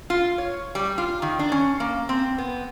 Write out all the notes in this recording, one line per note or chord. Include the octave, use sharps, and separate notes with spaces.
F4
C#5
G3
F4
D#3
D4
C#4
A#3
C4
B3